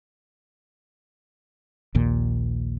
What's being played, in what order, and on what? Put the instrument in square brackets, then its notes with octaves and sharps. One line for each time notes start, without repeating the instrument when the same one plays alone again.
[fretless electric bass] A#1 D#2 A#2